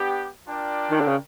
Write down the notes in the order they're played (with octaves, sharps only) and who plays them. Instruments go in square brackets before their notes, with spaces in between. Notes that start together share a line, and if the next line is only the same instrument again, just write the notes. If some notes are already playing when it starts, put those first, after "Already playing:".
Already playing: [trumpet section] B3 D4 G4
D4 F4 A#4 D5 G5
[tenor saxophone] D#3
D3
C#3